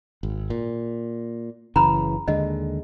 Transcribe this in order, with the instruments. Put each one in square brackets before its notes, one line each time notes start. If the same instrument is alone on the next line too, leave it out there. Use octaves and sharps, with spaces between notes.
[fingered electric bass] G#1
A#2
[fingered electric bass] F#1 C#3 E3 [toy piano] A#5 B5
[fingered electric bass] D#2 D3 G#3 [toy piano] D#5